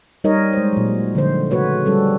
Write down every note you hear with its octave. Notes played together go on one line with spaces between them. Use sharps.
G3 D#4 A#4 C#5 D#5
G#3 C5
A#2 F#3
D3 F3 C5
C#3 A3 F#4 B4 C#5
G3 C#4 A4